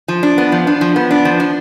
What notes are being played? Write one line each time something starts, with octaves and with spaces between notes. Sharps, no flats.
F3
D4
B3
F3
D4
F3
B3
D4
F3
D4